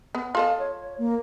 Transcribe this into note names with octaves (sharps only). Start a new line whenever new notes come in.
B3
F4 A4 D#5 F5
C#5
A#3